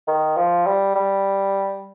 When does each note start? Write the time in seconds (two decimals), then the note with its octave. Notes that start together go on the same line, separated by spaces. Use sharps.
0.08 D#3
0.37 F3
0.66 G3
0.95 G3